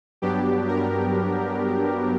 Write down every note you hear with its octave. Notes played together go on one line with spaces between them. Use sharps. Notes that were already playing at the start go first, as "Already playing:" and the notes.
G2 F#3 B3 D4 G4
A#4